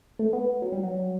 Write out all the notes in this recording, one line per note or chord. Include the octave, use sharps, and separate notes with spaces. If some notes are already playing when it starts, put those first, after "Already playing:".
A3
B3
F#3
G3
F#3